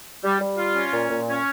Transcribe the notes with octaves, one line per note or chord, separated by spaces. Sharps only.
G3
G3
F4
C#4
A#2
A#2
C#4